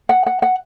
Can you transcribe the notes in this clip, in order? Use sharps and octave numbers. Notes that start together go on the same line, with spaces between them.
F#5
F#5
F#5